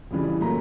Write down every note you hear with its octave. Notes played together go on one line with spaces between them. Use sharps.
F2 C#3 E3 G3
A#2 F#3 A3 A#5